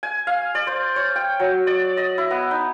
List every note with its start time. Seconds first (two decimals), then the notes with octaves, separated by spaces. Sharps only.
0.03 G#5
0.27 F5
0.55 D5
0.67 C5
0.96 C#5
1.16 G5
1.40 F#3
1.67 D5
1.97 D#5
2.18 E4
2.31 B3
2.51 D#4